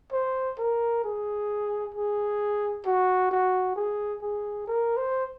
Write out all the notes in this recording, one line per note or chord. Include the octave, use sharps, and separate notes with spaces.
C5
A#4
G#4
G#4
F#4
F#4
G#4
G#4
A#4
C5